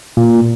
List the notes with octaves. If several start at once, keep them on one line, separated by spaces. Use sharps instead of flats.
A#2